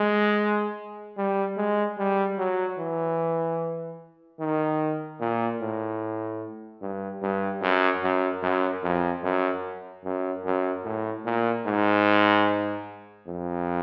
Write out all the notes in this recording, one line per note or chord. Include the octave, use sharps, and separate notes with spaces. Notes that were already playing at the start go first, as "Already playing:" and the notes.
Already playing: G#3
G3
G#3
G3
F#3
E3
D#3
A#2
A2
G2
G2
F#2
F#2
F#2
F2
F#2
F#2
F#2
A2
A#2
G#2
F2